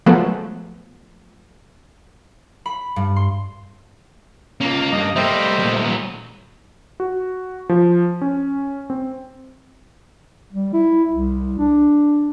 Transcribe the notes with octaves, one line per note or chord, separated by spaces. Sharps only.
F3 F#3 G#3 A3 B3
B5
G2
C6
A#3 C#4 F4
G2 D#5
G3 A3 A#3 C5 D#5 E5 G5
A#2 G3
F#3 B3
F#4
F3
C#4
C4
G3
E4
C2
D4